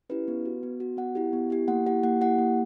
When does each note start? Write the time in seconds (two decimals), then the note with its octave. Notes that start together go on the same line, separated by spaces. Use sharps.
0.09 C#4 E4 G4 B4
0.28 B3
0.45 F#4
0.63 B3
0.80 F#4
0.97 B3 F#5
1.15 E4 G4
1.33 B3
1.50 E4 G4
1.68 A#3 F#5
1.86 E4 G4 F#5
2.03 A#3 F#5
2.21 E4 G4 F#5
2.38 A#3